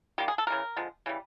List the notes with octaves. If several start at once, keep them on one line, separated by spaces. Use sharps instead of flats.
D#3 G3 A#3 G4
G#4
A4
C#3 E3 G3 A#4
D3 F3 G#3
C#3 E3 G3